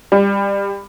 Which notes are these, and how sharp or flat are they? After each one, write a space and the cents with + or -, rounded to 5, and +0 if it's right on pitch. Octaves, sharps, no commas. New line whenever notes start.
G3 +25